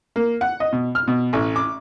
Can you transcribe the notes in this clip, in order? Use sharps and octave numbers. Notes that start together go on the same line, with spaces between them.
A#3
F#5
D#5
B2
F6
B2
A1
D6